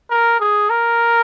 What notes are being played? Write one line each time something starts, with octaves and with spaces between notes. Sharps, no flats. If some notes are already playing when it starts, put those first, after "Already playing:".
A#4
G#4
A#4